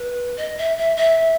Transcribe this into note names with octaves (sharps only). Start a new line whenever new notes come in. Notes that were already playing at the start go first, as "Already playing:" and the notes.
Already playing: B4
D#5
E5
E5
E5